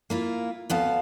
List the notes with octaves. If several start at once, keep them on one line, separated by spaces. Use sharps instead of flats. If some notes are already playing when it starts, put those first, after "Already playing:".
A#3 E4 F4
D2 B3 F5 A5